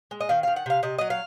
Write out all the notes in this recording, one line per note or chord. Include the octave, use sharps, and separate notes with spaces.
G#3
D#5
D#3 F5
D#3 F5
F#5
C3 F5
C3 D#5
F#3 D#5
F5